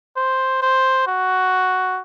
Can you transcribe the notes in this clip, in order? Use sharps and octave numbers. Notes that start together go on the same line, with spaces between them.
C5
C5
F#4